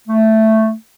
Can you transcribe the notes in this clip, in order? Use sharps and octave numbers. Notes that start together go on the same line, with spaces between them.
A3